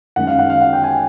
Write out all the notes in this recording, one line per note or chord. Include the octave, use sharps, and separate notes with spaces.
F#2 D#3 G#3 C#4 F#5
F5
F#5
F5
F#5
G5
G#5